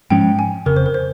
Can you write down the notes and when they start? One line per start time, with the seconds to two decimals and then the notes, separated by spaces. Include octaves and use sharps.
0.10 G#2 F3 G#3 C#4 G5
0.39 G#5
0.66 F1 F2 C#3 A#4
0.76 C5
0.86 A#4
0.94 C5